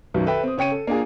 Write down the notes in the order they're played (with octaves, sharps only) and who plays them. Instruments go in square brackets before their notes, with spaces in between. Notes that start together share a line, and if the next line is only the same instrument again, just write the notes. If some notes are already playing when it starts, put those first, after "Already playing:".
[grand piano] B1 F#2 B2 D#3
A4 B4 E5 G5
C4 D#6
C#3 C#5 G5 C#7 D#7
A4
A#3 D4 F4 G#4